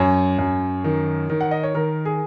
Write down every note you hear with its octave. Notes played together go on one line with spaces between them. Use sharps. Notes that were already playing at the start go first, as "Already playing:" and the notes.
Already playing: F#2 C#5
F#2
D#3
D#3
F#5
D#5
C#5
D#3 A#4
G#4